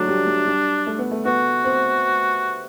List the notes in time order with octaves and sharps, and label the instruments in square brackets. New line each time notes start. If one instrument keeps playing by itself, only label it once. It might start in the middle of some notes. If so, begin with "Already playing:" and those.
Already playing: [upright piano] F#3 A3 [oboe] D4
[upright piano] G3
G3
G3
A3
B3
A3
[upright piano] B3 [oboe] F#4
[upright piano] C4